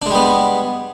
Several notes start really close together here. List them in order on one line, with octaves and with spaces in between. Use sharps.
D4 G#3 G3 B3